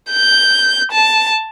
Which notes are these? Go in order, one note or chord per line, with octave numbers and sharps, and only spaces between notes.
G6
A5